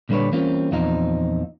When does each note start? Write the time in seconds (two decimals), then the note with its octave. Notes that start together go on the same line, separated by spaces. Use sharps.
0.09 A#2 D3 G3 D4 B4 C#5
0.32 E3 G3 A#3 C4 C#4 F4
0.72 E2 A#2 F3 C4 D#4 F5